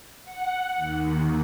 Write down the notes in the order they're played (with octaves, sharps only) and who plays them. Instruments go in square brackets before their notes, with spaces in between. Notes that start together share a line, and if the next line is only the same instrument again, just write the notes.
[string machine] F#5
D#2